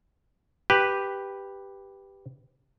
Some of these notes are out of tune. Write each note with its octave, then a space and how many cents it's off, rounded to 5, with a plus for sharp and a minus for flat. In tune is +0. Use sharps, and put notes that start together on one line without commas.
G4 +0 B4 +0